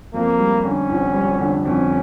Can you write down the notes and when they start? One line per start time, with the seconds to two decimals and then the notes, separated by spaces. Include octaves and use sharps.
0.13 F2 A#3
0.38 G3
0.64 D3 C#4
0.89 F1
1.14 G3
1.39 D3
1.64 F2 C#4